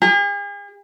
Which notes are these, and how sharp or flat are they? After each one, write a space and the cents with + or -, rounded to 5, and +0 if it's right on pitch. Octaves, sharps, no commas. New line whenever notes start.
G#4 -45